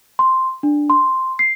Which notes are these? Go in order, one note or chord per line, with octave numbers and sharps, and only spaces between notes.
C6
D4
C6
C7